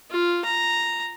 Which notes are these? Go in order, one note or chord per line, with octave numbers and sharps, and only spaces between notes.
F4
A#5